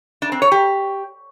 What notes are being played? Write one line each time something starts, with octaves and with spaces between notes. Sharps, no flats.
D4
C4
C#5
G4